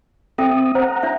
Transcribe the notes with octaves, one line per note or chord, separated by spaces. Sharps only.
C4 A4 E5 G5 D#6
C5 F#5 A#5
D4 E5